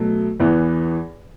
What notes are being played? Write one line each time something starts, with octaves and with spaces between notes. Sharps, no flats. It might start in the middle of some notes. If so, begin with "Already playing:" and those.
Already playing: B2 F#3 A3
E2 E3 B3